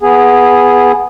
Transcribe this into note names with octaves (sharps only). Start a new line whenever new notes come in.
B3 G#4